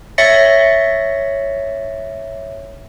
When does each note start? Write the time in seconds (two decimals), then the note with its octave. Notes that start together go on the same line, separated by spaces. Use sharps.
0.18 C#5 E5 A6 A#6 C#7